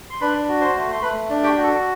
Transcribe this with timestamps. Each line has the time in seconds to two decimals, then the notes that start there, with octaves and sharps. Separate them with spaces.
0.10 C6
0.21 D4 B4 B5
0.48 F#4
0.61 C5 C6
0.76 A3
0.93 C6
1.02 A3 B4 B5
1.30 D4
1.43 G4 G5
1.57 F#4
1.63 A4